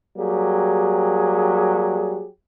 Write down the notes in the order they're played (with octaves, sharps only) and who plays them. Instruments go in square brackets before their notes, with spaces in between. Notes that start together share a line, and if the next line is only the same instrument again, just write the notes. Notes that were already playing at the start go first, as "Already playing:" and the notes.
[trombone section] F#3 G3 A#3 G4 G#4